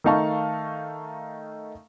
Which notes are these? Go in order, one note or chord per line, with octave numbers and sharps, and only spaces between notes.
D#3 A3 D#4 F5 A5 C#6